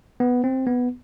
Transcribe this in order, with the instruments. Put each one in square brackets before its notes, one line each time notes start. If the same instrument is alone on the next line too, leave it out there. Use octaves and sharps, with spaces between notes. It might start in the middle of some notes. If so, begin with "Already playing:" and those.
[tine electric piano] B3
C4
B3